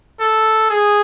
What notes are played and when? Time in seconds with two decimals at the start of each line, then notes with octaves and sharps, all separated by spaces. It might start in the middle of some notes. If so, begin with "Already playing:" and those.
0.21 A4
0.70 G#4